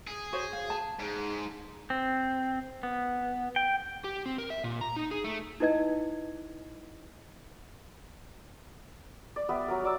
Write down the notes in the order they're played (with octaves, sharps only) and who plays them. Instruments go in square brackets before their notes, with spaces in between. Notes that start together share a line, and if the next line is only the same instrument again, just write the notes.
[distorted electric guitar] G#4
[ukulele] F#4 C5 C#5
F5
A5
[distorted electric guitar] G#2
[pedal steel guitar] C4
B3
G5
[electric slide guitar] G4
C4
A#4
E5
A#2
A#5
D#4
G#4
A3
[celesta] D#4 E4 B4 D#5 G#6
[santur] D5
G3 B3 B4 E5
F#3 A#4
D5 D6 E6